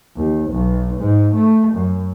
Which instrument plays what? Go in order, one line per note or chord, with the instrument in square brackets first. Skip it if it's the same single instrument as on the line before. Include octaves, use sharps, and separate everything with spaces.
[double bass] D#2
B1
G#2
A3
F#2